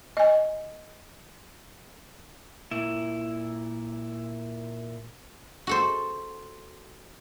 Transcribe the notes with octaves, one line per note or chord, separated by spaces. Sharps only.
D#5 G#5
A#2 E4
F#4 A4 C5